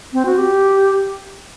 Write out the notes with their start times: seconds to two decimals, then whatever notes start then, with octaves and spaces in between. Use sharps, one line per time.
0.13 C4
0.25 F#4
0.38 G4